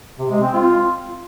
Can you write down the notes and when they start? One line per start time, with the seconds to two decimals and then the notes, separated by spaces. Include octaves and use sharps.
0.19 C3
0.31 G#3
0.42 C4
0.54 F4